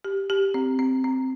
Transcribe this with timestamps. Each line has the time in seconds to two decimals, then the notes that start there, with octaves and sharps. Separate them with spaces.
0.04 G4
0.30 G4
0.54 C4
0.79 C4
1.04 C4